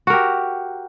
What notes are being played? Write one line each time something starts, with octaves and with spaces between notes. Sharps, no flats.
F#4 G4 A#4